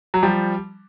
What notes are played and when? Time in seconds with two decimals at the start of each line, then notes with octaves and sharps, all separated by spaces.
0.14 F#3
0.23 F3 G3